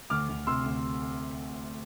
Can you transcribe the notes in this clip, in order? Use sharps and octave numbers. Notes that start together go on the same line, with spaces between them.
D2 D6 F6
D2
C3 C6 E6
D2